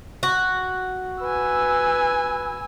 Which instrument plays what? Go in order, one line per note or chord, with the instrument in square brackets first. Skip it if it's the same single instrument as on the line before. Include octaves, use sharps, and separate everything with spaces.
[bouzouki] F#4
[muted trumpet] B4 [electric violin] G#5 E6